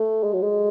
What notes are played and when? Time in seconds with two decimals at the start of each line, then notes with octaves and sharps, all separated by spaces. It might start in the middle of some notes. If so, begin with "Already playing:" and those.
Already playing: A3
0.23 G#3
0.33 F#3
0.42 G#3